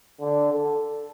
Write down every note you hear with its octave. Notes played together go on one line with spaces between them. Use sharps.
D3
A4